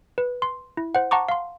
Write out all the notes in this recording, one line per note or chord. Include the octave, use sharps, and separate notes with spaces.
B4
C6
E4
C5 F#5
F#5 A5 A#5 C#6 D6
F5 C6